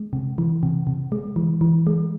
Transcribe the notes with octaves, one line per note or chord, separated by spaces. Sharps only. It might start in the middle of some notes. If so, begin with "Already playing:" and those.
Already playing: G#3
C3
E3
C3
C3
G#3
E3
E3
G#3